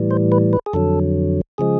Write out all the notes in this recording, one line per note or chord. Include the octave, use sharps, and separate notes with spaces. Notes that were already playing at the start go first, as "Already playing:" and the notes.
Already playing: A2 E3 G3
C5
B4
B4
G#4
F2 D3 F#3 A4
C#3 F3 G#3 G#4